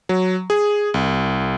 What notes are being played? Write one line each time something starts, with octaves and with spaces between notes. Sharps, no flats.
F#3
G#4
C2